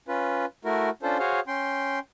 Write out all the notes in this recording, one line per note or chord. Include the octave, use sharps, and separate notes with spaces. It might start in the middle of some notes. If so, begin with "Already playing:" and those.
C#4 F4 B4
A3 E4 F#4 A#4
C#4 D4 F4 A4 C5
F#4 G#4 C5 C#5 F5
C#4 G5 C6